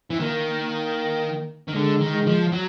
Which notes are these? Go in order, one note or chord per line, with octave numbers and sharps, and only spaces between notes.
E3
D#3 A#3
A#3
D#3
D3 G#3
D#3
G#3
F3
F#3